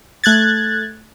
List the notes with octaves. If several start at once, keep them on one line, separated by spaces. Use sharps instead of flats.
A3 F#6 G#6 A6